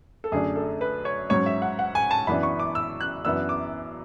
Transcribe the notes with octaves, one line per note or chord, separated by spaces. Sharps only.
A4
F#2 D3 A3 D4 G#4
A4
B4
C#5
G#2 F#3 C#4 C#5
E5
F#5
F#5
G#5
A5
F#2 E3 B3 D4 B5
C#6
D6
E6
F#6
F#2 E3 B3 D4 E6
D6